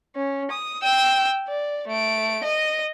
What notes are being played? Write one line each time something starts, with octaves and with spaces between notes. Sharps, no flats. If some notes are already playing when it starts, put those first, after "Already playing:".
C#4
D#6
G5 E6
D5
A3 D7
D#5 D#7